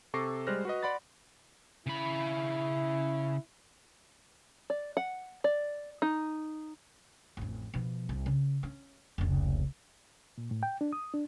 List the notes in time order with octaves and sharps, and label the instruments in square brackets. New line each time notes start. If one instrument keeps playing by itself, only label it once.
[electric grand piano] C3 A4 C#6 D6 A#6 C7
G3 G#3 C5 F6 F#6 A#6
F#4 B4 D#5
D5 F#5 B5 C6 A6
[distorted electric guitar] C#3 B5 [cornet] E4
[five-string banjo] D5
F#5
D5
D#4
[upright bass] A1 F2
B2 F3
C2
C#3
C#4
F1 C#2
[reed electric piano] A#2
A2
G5
D4
D#6
D4